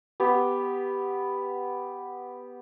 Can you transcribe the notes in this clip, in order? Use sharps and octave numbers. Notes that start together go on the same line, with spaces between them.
B3 G4